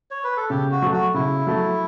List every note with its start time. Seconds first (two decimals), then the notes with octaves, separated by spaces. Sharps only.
0.11 C#5
0.24 B4
0.37 A4
0.50 C#3 G4
0.71 F#4
0.82 F#3 A3
0.93 F#4
1.14 C#3 E4
1.47 F#3 A3